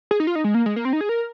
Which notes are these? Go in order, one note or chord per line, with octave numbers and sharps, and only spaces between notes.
G#4
D#4
F4
D#4
G#3
A#3
G#3
A#3
C4
D#4
G#4
A#4